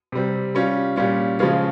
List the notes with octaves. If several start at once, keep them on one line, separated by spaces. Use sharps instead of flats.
C3 G3 C4
G3 C#4 F4
A#2 G3 C#4 F4
C#3 F3 G#3 C#4 F4